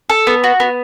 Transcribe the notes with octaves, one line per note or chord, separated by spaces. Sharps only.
A4
B3
F#4
B3